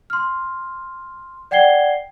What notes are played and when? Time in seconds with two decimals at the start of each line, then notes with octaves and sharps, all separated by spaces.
0.10 C6 F6
1.51 D5 F#5 G5 G#6 C7 G7